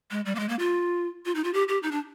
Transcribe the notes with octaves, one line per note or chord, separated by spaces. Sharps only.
G#3
G3
A#3
G#3
A#3
F4
F4
D#4
F4
G4
G4
D#4
D4